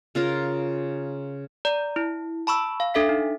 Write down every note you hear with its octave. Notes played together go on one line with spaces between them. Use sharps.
C#3 F4 A#4
D5 A#5
E4
A5 B5 C#6 E6
F5
D4 A4 E5 B6
D#4